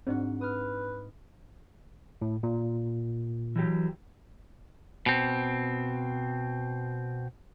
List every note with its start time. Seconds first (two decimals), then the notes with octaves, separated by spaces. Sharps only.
0.07 G#2 C4 D4 F#4
0.41 B4 D#6 F6
2.22 A2
2.43 A#2
3.56 E3 F#3 G4
5.06 B2 C4